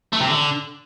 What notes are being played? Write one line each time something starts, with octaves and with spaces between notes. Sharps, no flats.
A3
C3
D3